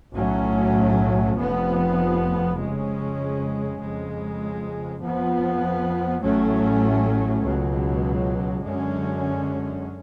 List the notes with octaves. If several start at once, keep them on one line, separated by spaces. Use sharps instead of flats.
B1 A2 F#3 A3 C#4
F1 F2 F3 B3
F2 C#3 G#3 C#4
F2 C#3 G#3
F2 F3 B3
A1 A2 F#3 A3 C#4
C#2 B2 F#3
F#2 D3 G#3 C#4